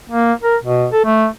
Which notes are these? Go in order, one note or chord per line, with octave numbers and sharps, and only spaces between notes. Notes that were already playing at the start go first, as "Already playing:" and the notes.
A#3
A#4
B2
A4
A3